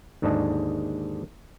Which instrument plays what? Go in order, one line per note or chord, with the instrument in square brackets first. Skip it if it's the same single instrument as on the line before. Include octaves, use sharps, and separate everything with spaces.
[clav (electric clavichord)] D#2 G#2 D3 D4 G#4 D#5